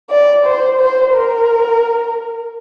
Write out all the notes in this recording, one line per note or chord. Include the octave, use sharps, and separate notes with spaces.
D5
C5
C5
A#4